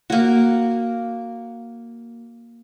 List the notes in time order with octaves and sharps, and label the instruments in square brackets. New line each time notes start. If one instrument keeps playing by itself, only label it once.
[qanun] A#3 F#4